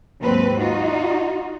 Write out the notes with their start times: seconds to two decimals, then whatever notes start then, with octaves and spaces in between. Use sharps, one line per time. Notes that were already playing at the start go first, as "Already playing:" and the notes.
0.20 D#2 G#2 F#3 C4 B4
0.59 D#4 F4 F#4